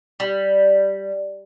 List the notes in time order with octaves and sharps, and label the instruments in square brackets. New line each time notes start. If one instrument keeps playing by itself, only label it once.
[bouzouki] G3